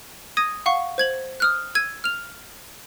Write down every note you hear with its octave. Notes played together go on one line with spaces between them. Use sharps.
D#6 G#6 A#6 D#7
F5 F#5 C#6
C5 G#6 F#7
D#6 F6 F#6
E6 G#6 D#7
F6 F7